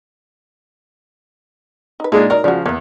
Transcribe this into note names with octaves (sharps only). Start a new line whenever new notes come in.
D#4 B4
A#2 G#3 D4 D#4 G#4 A4
F#3 D#4 A#4 D5
C#3 F3 F#4 D5
E2 A#3 B3